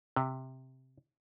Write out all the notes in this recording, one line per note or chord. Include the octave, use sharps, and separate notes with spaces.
C3